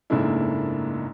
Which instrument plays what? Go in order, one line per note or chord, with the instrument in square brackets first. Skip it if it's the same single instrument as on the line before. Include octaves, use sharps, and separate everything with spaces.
[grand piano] F#1 G#2 A3 A#3 D4 E4